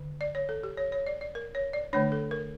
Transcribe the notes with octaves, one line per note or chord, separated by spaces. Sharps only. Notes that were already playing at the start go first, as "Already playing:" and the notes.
Already playing: D3
D5
C#5
A4
G4
C#5
C#5
D5
D5
A#4
C#5
D5
D3 A3 D4 C#5
A4
A#4